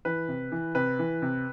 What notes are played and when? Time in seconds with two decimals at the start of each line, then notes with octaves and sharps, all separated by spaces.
0.05 E3 B4
0.28 C3
0.52 E3
0.75 C3 B4
0.99 E3
1.22 C3